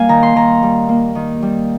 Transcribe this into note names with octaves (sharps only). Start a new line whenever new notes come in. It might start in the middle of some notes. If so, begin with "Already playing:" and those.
Already playing: G3 A#3 F5 G#5
D#3 A#5
C6
D#3 A#5
G3
A#3
D#3
G3